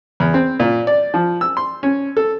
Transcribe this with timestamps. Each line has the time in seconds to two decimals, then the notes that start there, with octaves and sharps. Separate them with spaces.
0.20 E2
0.34 C4
0.60 A#2
0.87 D5
1.14 F3
1.41 E6
1.57 C6
1.83 C#4
2.17 A4